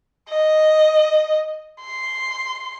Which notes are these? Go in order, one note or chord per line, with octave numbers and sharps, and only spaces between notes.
D#5
C6